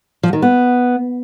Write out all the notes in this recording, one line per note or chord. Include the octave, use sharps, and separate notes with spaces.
F3
D#3
B3